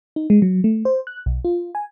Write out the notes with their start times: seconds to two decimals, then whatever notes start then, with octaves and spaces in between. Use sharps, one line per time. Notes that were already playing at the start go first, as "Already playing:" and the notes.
0.16 D#4
0.30 G#3
0.42 F#3
0.64 A3
0.85 C5
1.07 F#6
1.26 B1
1.45 F4
1.75 G#5